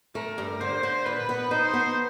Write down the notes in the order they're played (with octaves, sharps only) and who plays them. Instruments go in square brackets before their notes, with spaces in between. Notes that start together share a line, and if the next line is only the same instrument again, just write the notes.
[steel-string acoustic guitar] A3 [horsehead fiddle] A#4
[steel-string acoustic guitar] G2
[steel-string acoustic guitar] D3 [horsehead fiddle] C5
[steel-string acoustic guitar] D3
[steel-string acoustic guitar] A#2 [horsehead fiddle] B4
[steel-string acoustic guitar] B3
[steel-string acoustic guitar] D#4 [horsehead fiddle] C5
[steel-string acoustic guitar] B3